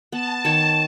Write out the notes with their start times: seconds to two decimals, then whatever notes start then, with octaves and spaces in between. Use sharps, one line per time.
0.12 B3 A5
0.45 D#3 C#5 E7